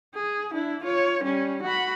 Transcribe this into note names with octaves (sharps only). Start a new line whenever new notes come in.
G#4
D4 E4
F4 C#5
G3 C#4
F#4 B5